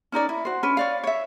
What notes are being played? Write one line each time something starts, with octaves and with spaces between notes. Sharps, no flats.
C#4 D#4 A#4 D5
E4
F#4 C5
C#4 D4 B4
C#5 D5 F5
C#5 E5